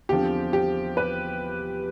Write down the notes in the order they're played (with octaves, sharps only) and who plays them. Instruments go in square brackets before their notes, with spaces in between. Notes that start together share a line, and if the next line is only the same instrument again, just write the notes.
[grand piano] E2 D3 F3 C4 [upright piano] G4
[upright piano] G4
B4